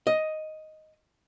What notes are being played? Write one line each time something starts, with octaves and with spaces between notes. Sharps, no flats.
D#5